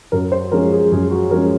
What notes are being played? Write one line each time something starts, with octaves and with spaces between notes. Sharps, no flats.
F#2 A#4
C5
F3 G#3 C#4 A#4
G#4
F#2 G#4
F#4
F3 G#3 C#4 A#4